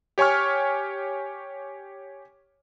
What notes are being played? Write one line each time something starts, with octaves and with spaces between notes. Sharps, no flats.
G4 C#5 G#5 C#6 F6